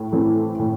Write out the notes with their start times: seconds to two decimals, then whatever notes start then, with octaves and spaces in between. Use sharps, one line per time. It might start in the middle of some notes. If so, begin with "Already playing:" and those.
Already playing: A2
0.12 E3 A3 C4
0.59 A2